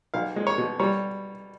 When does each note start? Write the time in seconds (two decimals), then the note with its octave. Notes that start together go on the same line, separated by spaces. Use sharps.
0.14 B1 F5
0.36 G#3
0.47 C#5
0.58 B2
0.79 G3 C#5